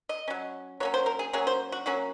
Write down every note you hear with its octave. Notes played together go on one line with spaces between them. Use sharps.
D#5
F#3 C#4
F#3 A#3 C#4 C#5
C5
A#4
G#4
F#3 A#3 C#4 G#4
C5
F#4
F#3 A#3 C#4 F#4